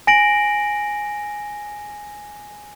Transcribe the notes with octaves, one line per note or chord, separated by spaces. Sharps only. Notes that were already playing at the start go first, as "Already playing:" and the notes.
G#5 A#6 D7 F#7